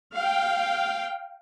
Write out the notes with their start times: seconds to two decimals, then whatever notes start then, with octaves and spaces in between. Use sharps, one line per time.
0.16 F5 G5